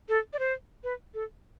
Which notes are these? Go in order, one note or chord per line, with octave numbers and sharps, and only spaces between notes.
A4
D5
C5
B4
A4